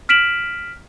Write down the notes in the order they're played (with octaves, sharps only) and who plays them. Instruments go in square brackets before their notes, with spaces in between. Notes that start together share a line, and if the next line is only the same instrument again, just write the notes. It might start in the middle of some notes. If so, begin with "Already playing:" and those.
[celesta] F6 B6 D7 E7 F#7